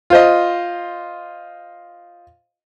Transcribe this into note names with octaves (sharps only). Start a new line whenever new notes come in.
F4 C5 D#5